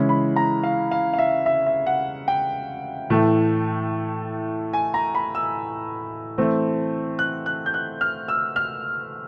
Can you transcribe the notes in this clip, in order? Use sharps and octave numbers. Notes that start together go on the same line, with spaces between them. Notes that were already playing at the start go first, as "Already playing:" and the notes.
Already playing: C#3 E3 G#3 C#4 E4
B5
A#5
F5
F5
F5
E5
E5
E5
F#5
G5
A2 E3 A3
G#5
A#5
B5
E6
E3 A3 C4
F#6
F#6
G6
F#6
F6
E6
F6